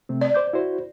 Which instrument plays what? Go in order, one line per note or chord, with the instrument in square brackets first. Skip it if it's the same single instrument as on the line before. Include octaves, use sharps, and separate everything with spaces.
[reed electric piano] C3 A3 C4
[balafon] D5
[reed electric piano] C5 D6 G6
E4 F#4 C5